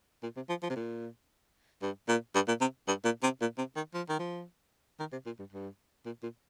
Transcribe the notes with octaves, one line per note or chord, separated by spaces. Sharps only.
A#2
C3
F3
F3
C3
A#2
G2
A#2
G2
A#2
C3
G2
A#2
C3
A#2
C3
D#3
F3
D#3
F3
D#3
C3
A#2
G2
G2
A#2
A#2